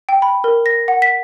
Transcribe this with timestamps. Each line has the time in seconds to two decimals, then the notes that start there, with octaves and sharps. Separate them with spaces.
0.09 G5
0.22 B5
0.44 A#4
0.66 A#6
0.88 F#5
1.02 B6